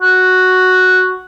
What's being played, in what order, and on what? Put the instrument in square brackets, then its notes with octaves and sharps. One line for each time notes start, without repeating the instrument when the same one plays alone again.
[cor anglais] F#4